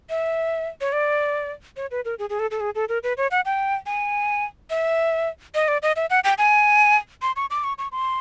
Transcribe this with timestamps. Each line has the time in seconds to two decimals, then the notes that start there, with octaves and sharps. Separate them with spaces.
0.10 E5
0.81 C#5
0.93 D5
1.77 C#5
1.91 B4
2.05 A#4
2.19 G#4
2.30 G#4
2.39 A4
2.51 A4
2.60 G#4
2.75 A4
2.89 A#4
3.03 B4
3.17 C#5
3.31 F#5
3.45 G5
3.86 G#5
4.70 E5
5.55 D#5
5.68 D5
5.82 D#5
5.96 E5
6.10 F#5
6.24 G5
6.38 G#5
7.22 C6
7.36 C#6
7.51 D6
7.64 C#6
7.78 C#6
7.92 C6